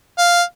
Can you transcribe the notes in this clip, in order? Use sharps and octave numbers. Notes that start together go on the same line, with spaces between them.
F5